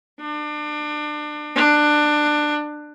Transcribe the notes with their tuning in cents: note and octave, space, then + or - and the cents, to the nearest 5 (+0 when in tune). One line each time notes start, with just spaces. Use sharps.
D4 +30
D4 +20